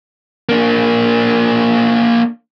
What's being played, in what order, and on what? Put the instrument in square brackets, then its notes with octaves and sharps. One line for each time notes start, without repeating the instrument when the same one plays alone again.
[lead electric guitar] A#3 D4